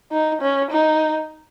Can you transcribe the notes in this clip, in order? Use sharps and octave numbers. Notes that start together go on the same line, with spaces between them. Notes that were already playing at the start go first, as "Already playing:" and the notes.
D#4
C#4
D#4